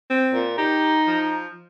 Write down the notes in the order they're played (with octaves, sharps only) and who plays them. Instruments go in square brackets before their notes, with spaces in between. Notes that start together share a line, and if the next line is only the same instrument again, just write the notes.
[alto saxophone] C4
[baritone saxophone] A#2
[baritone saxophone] D#4 [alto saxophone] G4
[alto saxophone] F3